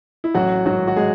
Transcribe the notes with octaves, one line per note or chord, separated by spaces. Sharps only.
E4
A1 F#3 F#4
G#2 D#3 F#3 F#4
F#4
G#3 G#4